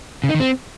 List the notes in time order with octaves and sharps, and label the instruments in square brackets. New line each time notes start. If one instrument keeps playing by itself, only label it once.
[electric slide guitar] C#3
D#4
D#3
C4